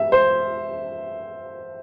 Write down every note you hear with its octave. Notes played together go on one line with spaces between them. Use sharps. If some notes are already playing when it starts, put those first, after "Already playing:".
Already playing: E5
C5